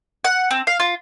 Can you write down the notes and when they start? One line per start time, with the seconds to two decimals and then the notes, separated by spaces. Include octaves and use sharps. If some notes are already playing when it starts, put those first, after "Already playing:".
0.24 F#5
0.51 C4
0.67 F5
0.80 F4